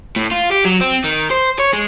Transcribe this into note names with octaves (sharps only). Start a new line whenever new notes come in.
A2
F4
G4
F#3
C4
D#3
C5
C#5
G#3